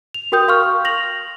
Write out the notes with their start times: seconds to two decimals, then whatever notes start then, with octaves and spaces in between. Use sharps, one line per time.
0.14 F7
0.32 F#4 A#4 G5 D#6 G6
0.48 F5 C6 C#6 F6
0.85 A#6 F7 F#7